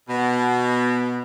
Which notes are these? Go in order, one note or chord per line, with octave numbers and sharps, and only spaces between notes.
B2